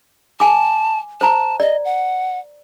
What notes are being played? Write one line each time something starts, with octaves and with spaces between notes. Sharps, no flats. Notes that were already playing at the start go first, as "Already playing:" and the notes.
G#5 A5 D6
C5 A5 A#5
D5 D#5
F#5